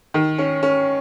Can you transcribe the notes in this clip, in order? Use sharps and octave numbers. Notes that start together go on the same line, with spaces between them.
D#3
C#4
C#4